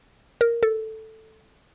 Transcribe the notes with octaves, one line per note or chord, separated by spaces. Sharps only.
A#4
A4